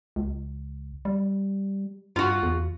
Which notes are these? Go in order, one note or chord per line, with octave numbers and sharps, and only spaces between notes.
C#2
G3
G2 F4 F#4
E2